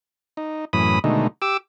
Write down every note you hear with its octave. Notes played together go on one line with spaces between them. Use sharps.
D#4
F#2 A2 E3 B5 D#6
B2 D3 D#3 G#3 A3 D#4
G4 D6 E6